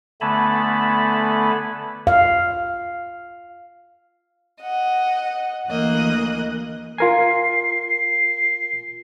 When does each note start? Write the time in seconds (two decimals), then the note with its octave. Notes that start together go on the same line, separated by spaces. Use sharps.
0.21 D3 A3 B3 G#5 A5 B5
2.07 F5
4.60 D#5 F#5
5.68 D2 E3 A#3 D#5 F#6
6.98 F4 A#4 G#5 C7
7.87 C7